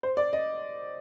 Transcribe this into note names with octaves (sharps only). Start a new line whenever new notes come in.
C5
D5
D#5